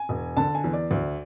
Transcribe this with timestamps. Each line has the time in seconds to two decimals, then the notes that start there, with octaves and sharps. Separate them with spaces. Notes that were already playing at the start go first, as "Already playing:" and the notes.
Already playing: G#5
0.09 E1
0.37 D3 A5
0.55 G#5
0.64 E2
0.73 D5
0.91 D2